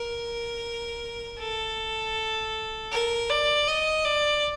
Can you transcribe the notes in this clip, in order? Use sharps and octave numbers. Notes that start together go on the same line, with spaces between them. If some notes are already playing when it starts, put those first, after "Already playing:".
Already playing: A#4
A4
A#4
D5
D#5
D5